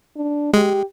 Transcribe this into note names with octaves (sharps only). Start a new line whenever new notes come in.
D4
G#3 G4